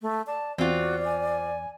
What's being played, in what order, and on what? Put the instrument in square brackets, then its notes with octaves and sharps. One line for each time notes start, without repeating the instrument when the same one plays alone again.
[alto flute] A3
[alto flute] D5 [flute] A5
[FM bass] E2 [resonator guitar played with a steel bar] C4 F4 [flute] F#4 [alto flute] D5
[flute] G#5